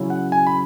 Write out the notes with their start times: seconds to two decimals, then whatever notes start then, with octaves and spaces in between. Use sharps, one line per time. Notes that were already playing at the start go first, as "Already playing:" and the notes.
Already playing: C#3 F#3 C#4 E4
0.10 F#5
0.32 G#5
0.47 B5